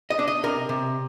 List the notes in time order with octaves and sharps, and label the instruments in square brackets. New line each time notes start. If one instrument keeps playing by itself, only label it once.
[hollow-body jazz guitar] D#5
D4
D#5
C3 A#4
C3